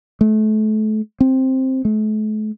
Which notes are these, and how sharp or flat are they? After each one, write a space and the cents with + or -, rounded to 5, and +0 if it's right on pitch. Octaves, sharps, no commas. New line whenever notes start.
A3 -30
C4 +5
A3 -40